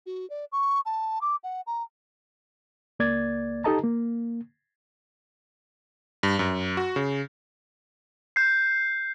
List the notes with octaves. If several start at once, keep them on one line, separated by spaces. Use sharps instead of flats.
F#4
D5
C#6
A5
D6
F#5
A#5
C#2 A#3 D5 G#6 A6
D#4 G4 A4 D#5 A5 A#5
A#3
G2
F#2
F#4
C#3
G6 C7